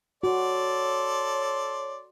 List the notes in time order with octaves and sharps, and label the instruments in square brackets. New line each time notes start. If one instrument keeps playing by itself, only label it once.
[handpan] F#4 [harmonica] A4 D5 C6 [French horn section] C#5